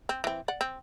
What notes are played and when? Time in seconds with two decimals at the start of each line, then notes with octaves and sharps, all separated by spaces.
0.09 C4
0.24 E3 C4
0.48 D5 F#5
0.61 C4